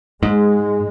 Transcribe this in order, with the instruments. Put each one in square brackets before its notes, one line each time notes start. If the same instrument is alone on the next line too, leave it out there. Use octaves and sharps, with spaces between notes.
[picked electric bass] G#2 [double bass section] G#3